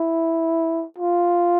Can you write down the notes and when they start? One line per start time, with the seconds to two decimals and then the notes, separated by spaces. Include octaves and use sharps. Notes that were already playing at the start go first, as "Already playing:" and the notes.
Already playing: E4
0.98 F4